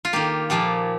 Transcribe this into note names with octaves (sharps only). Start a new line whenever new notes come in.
F4
D#3 A#3 G4
A#2 F3 A#3 G4